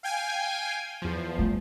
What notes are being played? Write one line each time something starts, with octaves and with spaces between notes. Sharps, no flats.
F5 G5 G#5
E2 F3
G3 A3